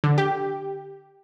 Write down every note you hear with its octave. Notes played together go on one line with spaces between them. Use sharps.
D3
G4